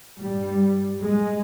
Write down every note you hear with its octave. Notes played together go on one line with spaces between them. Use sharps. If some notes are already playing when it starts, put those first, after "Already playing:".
G2 G3
G#3